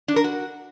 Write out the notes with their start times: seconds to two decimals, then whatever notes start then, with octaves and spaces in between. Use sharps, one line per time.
0.08 D4
0.16 A#4
0.24 F#4